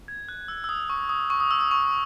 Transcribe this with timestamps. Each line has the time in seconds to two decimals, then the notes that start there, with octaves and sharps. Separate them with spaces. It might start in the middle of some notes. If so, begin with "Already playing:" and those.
0.08 G#6
0.29 F#6
0.48 E6
0.64 E6
0.69 D#6
0.90 C#6
1.09 D#6
1.30 C#6
1.40 D#6
1.51 E6
1.61 D#6
1.71 C#6